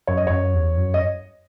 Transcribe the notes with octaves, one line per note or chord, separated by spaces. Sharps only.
F#2 C#5
D#5
F#2 C#5
E2
F#2
D#5